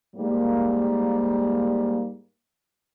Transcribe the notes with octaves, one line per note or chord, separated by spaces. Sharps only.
G#2 G3 A#3